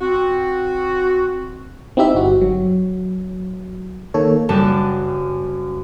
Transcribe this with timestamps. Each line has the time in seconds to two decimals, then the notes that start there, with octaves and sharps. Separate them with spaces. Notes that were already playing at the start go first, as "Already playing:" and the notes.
0.01 C4 F#4
1.97 C4 D#4 E4 G4 E5
2.14 G1 F#4
2.41 F#3
4.14 D#3 A#3 A4 C#5
4.49 F#1 F#2 G3 D4 A5